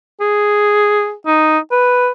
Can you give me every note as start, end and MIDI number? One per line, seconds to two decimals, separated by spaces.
0.21 1.13 68
1.27 1.59 63
1.71 2.09 71